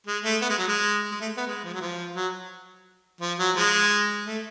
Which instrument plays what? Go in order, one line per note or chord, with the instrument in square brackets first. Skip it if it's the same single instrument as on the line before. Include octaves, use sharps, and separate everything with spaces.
[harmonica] G#3
A3
B3
G#3
F#3
G#3
G#3
A3
B3
G#3
F3
F#3
F3
F#3
F3
F#3
F3 G#3
A3